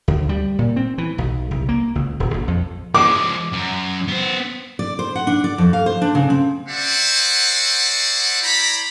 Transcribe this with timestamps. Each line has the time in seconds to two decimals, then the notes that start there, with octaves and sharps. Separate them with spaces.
0.08 D2
0.29 G3
0.59 A#2
0.76 C4
0.98 E3
1.18 B1
1.51 C2
1.69 A#3
1.95 C#2
2.20 D#1
2.34 A#1
2.48 F2
2.94 F3 G#3 D6
3.52 F#2
4.08 B3 C5
4.79 D5
4.99 C5
5.16 F#5
5.27 D4
5.44 D5
5.58 F2
5.73 F5
5.86 C5
6.02 D4
6.15 C#3
6.30 C4
6.68 F#4 G#4 C5 D5 E5 F#5
8.42 E4 C5 D5 A#5 B5